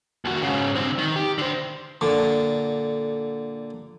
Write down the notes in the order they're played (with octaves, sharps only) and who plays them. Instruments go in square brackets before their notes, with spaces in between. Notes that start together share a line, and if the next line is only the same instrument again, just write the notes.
[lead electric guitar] D#2 F#4
G#2 C#3
D3 C4
D#3
G4
D3 C5
[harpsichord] A#2 D3